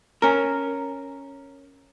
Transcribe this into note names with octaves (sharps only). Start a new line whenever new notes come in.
C#4 A#4